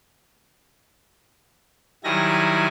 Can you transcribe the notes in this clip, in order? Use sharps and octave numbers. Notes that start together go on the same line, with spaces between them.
D#3 F#3 G3 E4 G#5 A#6